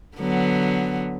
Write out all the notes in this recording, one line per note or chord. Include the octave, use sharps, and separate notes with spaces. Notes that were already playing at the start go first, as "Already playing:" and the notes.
D3 F#3 B3